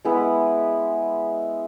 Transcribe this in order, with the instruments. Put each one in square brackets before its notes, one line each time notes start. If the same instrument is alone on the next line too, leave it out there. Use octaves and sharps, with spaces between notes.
[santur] G#3 B3 E4 B4